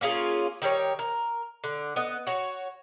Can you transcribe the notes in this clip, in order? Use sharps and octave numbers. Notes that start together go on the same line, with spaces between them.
A#3 C#4 F4 G#4
D#3 G3 A#4 C#5
A#4
D3
B3 D#5
F#4 C#5